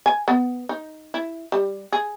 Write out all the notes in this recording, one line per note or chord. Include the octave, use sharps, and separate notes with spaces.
G#5
B3
D#4
E4
G3
G#4